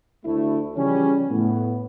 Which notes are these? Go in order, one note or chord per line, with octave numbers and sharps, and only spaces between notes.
D2 A3 E4
C#3 E3 F3 G3 C#4
A2 B3